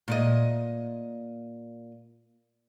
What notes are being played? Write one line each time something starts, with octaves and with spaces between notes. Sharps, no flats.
A#2 D5 D#5